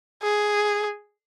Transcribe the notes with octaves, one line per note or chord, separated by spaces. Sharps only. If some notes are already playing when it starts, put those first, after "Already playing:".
G#4